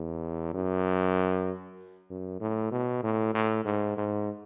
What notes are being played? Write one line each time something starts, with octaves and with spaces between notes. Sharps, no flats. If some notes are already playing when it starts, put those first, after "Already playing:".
Already playing: E2
F#2
F#2
A2
B2
A2
A2
G#2
G#2